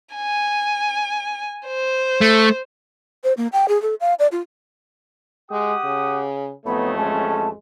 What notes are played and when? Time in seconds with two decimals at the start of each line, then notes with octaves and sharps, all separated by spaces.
0.15 G#5
1.67 C5
2.21 A3
3.24 C5
3.37 A#3
3.53 G5
3.68 G#4
3.82 A4
4.01 F5
4.19 D5
4.32 F4
5.51 G#3 G4 F#5 D#6
5.85 C#3
6.66 A1 F2 A3 B3 D#4 C#5 B5
6.97 G#3 C#4 A5